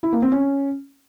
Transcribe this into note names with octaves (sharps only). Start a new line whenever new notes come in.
E4
A#3
C4
C#4